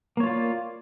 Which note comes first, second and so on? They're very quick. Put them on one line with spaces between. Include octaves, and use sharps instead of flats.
A#3 C#5 F4 D5